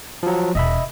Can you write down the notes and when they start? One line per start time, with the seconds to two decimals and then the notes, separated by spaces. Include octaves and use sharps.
0.23 F3 F#3
0.55 E1 D#5 E5 B5